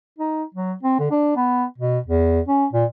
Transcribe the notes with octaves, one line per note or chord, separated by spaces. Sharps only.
D#4
F#3
C4
D3
D4
B3
B2
E2
C#4
A#2